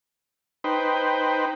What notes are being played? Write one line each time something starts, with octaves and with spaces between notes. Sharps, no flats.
D#4 B4 C5 G5